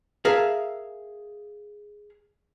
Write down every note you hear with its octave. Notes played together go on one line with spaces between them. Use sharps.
G#4 A#4 E5 F5 A5